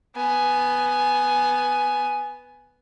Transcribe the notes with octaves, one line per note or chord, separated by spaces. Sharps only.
B3 G#5